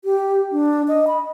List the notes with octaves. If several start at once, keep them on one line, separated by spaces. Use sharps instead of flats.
G4
D4
D#5
B5